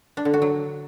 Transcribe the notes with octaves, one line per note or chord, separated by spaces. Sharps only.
D4
D3
F#4
F#3